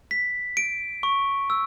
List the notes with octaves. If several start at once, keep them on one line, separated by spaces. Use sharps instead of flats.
B6
D7
C#6
E6